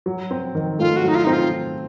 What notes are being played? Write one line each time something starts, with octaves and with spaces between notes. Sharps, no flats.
F#3
C4
D#3
A3 F4
F#4
F#3 D#4
F4
C4 D#4
F4